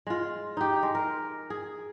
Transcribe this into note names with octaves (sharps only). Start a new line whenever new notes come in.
G#3 F4
D#4 G4
G#3
A#4
G#4